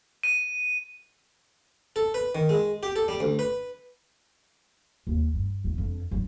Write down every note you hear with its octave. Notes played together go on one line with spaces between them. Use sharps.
D#7
A4
B4
D#3
G#3
G4
A4
G3
D2
B4
D#2
G2
D1
F2 D4
F#3